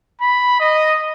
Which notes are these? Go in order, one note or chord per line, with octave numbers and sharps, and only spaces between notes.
B5
D#5